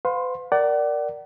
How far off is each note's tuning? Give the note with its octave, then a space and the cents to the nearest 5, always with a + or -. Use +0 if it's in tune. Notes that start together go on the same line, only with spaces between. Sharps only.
B4 +45 F5 +30 C6 +25
A#4 +0 D5 +0 F#5 +35